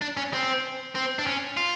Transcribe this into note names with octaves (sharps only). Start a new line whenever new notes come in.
D4
C#4
C4
C4
D4
C#4
F4